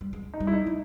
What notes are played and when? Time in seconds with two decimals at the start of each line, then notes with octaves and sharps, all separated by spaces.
0.01 G3
0.13 G#3
0.34 D#4
0.40 G3
0.47 E4
0.53 D#4
0.67 A3